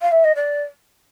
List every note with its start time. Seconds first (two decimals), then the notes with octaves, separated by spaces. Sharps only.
0.02 F5
0.12 E5
0.24 D#5
0.35 D5